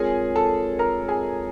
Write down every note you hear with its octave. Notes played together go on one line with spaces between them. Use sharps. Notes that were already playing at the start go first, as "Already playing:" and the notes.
Already playing: G#3 C4 F4 G#4 A#4 C#5 G#5
A4 A5
A#4 A#5
G#4 G#5